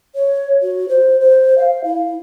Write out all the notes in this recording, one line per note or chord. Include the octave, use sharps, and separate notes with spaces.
C#5
F#4
C5
C5
F5
E4